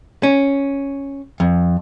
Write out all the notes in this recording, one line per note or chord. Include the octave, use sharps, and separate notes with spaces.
C#4
F2